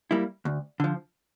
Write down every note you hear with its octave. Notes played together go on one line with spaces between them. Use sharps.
G3 A#3 E4
D2
D3 F3